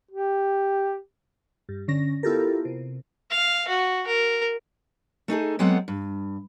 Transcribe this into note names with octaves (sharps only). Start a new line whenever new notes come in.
G4
G2
D3 C#4 A#6
B3 E4 F4 G4 A4 A#4
C3
F5
F#4
A#4
A3 D#4 G#4 A4
F#3 G#3 B3 C4 A4 F#5
G2